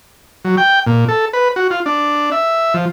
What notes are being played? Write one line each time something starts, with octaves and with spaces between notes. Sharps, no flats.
F#3
G5
A#2
A4
B4
F#4
F4
D4
E5
F3